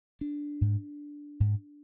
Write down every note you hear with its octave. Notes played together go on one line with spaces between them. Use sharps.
D4
G#2
G#2